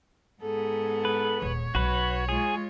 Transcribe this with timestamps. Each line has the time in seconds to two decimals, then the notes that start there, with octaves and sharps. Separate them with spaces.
0.42 G#2 B3 G#4 A4
1.05 B4
1.42 D#1 C#5
1.75 B1 F#4 B4
2.29 G#3 F4 G#4